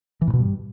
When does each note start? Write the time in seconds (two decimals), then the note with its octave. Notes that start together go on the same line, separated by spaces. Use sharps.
0.21 E3
0.27 A2
0.33 B2
0.39 G2